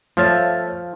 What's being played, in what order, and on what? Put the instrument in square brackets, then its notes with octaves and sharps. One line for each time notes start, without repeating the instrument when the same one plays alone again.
[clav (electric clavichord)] F3 [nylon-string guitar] A3 C#5 E5 [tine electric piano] F5 F6 A6